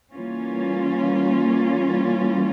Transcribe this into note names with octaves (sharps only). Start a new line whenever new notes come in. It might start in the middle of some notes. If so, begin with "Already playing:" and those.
E3 G3 A#3 C#4 F4